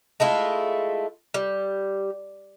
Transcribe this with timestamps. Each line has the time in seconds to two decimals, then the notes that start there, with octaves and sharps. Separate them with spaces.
0.20 G#3 A3 E4 F4
1.34 G3